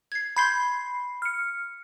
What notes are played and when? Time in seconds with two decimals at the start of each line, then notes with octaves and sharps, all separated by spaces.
0.12 G#6 C7
0.37 B5 C6 G6 G#6 C7
1.22 F6 C#7